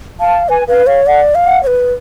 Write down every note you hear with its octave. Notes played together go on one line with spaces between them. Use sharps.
F5 A5
B4 G#5
B4 F5
C#5 F5
D5 F#5
F5
F#5
C#5
B4